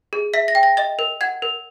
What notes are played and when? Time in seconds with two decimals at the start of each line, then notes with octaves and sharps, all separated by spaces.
0.13 G#4
0.34 E5 B6
0.48 A#6
0.55 G5
0.63 A#6
0.77 D#5 A6
0.99 A#4
1.21 F#5 G#6
1.42 A#4